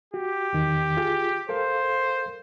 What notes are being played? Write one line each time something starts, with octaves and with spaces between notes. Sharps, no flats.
F#4 G4
E2 D#3
F4 G#4
A4 A#4 C5 F5